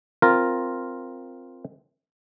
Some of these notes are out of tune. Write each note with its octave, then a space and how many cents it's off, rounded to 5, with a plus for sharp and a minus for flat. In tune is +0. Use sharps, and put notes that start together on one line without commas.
C4 +0 F4 +0 A#4 +0